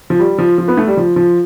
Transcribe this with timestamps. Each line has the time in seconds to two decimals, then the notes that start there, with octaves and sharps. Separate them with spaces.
0.10 F3
0.19 G3
0.39 F3
0.58 F3
0.68 B3
0.77 A3
0.87 G3
0.97 F3
1.16 F3